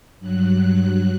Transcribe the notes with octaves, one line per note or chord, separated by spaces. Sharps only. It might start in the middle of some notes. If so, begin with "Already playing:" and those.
G2 F#3 F#6